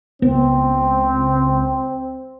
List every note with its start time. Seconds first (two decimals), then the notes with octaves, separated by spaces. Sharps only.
0.22 C#2 B3 C4